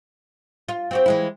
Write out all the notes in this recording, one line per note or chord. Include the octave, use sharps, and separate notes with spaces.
F4
C4 F#4 G4
E3 G#3 E4